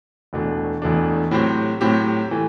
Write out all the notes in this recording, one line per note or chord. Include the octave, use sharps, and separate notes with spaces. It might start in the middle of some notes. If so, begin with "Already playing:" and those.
E1 E2 B2 A3 D4
E1 E2 B2 A3 D4
A2 F#3 C4 G4
A2 F#3 C4 G4
E3 A3